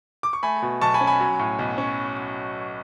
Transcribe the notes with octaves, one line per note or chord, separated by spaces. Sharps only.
D6
C#6
A3 G#5 B5
B2
B1 A5 C#6
G#5 B5
C#4
G#5 B5
F#3
A2
B1
C#4